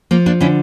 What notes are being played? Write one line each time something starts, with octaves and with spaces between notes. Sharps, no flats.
F3 A#3
A#3 D4
D3 C#4 E4